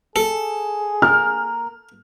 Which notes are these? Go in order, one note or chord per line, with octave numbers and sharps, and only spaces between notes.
G#4 A4
A#3 A#4 F6